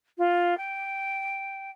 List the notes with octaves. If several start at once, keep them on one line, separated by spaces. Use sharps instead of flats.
F4
G5